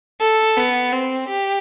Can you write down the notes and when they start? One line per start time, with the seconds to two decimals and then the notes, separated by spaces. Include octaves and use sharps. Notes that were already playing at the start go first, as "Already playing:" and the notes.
0.21 A4
0.57 B3
0.92 C4
1.28 G4